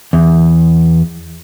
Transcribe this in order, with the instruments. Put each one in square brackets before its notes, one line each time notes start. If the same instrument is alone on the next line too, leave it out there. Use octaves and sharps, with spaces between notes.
[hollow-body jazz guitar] E2